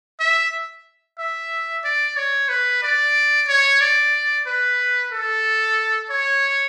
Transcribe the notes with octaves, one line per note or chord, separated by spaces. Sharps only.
E5
E5
D5
C#5
B4
D5
C#5
D5
B4
A4
C#5